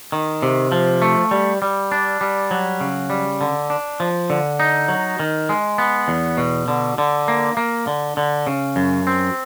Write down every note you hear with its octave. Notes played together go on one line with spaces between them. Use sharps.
D#3
C3
F3
A3
G3
G3
D4
G3
F#3
C#3
G3
D3
D4
F3
D3
D#4
F#3
D#3
G#3
B3
E2
B2
D3
D3
A#3
A#3
D3
D3
C#3
F#2
C4